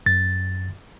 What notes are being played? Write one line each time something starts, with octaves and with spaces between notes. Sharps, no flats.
F#2 A6